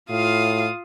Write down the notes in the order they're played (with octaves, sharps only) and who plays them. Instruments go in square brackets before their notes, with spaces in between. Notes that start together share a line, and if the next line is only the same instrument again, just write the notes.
[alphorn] A2 [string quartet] F4 F5 D#6